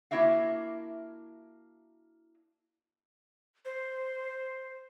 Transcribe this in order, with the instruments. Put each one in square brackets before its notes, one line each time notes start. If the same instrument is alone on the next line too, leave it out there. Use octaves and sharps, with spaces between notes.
[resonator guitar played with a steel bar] A#3 D4 E4 F#4 E5 F5
[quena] C5